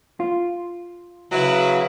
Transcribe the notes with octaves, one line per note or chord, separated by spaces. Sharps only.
F4
C#3 F#3 E4 B4